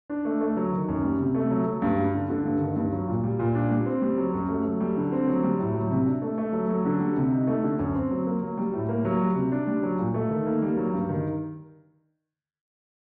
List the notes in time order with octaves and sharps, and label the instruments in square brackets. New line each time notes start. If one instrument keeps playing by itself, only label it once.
[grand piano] D4
A3
A3
F#3
D#3
F#2
G3
C3
A3
F#3
F#3
G2
G3
D3
D3
G2
D#3
G2
F#3
A#2
G3
A#2
D4
G3
C4
G3
F#3
F#2
A3
F#3
G3
D3
C4
F#3
G3
A2
F#3
C3
D4
A3
A3
F#3
F#3
D3
G3
C3
D#4
A3
D3
F#2
C4
F#3
A#3
F#3
G3
A2
A#3
F#3
G3
C3
D4
G3
F#3
A#2
A3
D#3
A#3
G3
F#3
G2
D#3